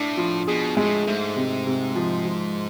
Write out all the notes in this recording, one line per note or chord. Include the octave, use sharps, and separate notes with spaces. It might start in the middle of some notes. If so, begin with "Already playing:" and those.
Already playing: A2 D4
F3
B2 G#4
A2 G#3
G#2 A3
C3
C3
F3
F3